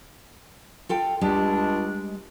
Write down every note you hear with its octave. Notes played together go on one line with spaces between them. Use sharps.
F4 A4 G5
C#2 G3 G#3 D4